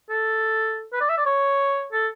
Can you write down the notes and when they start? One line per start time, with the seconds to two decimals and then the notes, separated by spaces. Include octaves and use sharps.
0.09 A4
0.93 B4
1.01 D5
1.09 E5
1.17 D5
1.26 C#5
1.92 A4